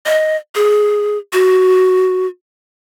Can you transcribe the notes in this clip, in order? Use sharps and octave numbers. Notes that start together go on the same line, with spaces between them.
D#5
G#4
F#4